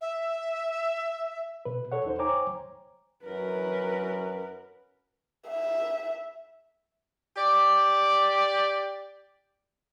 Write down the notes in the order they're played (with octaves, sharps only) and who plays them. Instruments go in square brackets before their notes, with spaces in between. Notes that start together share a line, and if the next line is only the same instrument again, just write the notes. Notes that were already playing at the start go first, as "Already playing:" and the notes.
[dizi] E5
[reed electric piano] B2 B4
A4 C#5 F#5
D#2 D#4 C5
C5 C#5 G5 G#5 A#5 D6
[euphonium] F#2 [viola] A#4 [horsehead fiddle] B4
[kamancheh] E5
[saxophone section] G4 D5